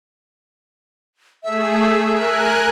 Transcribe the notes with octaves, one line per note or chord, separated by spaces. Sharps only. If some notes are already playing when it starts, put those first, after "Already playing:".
A3 G#4 E5
A#4 G#5 F#6